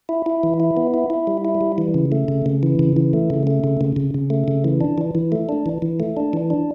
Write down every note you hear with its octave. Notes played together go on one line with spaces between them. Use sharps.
E4
E4
E3
E4
B3
E4
E4
G3
E4
G3
E3
C#3
A3
C#3
C#3
E3
C#3
E3
A3
C#3
A3
C#3
C#3
C#3
C#3
A3
C#3
E3
D4
E3
E3
A3
D4
E3
E3
A3
D4
E3
D4